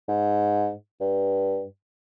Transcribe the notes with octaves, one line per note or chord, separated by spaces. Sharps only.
G#2
G2